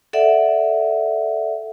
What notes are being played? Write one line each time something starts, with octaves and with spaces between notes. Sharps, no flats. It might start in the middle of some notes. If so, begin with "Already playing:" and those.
A4 D5 E5 F#5